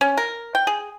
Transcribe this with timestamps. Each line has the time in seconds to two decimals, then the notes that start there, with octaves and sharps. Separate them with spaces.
0.01 C#4
0.17 A#4
0.55 G5
0.67 G#4